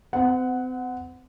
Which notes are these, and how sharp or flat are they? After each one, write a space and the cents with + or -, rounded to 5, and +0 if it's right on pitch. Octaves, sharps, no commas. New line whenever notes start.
C4 -40 F#5 +0